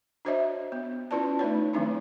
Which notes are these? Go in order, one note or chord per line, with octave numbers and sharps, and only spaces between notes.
D4 F#4 C5 C#5 D#5 E5
B3
C#4 E4 F4 B4 D5 A5
A3 D#4 B4 C#5
D#3 F#3 A3 C4 D4 E4